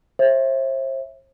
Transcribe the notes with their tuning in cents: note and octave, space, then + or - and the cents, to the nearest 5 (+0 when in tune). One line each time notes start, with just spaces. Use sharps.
C5 +40 E5 +0